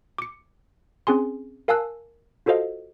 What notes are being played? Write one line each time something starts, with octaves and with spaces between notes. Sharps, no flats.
D6 C#7
C4 C#4 G#4 G#5 C6
A#4 F5 G#5 A5 E6 F#6
F4 F#4 A4 C5 D#5 F5